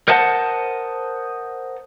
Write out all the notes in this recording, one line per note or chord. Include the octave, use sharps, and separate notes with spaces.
A#4 C5 D#5 F#5 A5